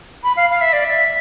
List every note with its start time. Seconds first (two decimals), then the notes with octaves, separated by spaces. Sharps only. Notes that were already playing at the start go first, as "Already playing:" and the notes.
0.24 B5
0.37 F5
0.50 F5
0.61 E5
0.73 D5
0.85 E5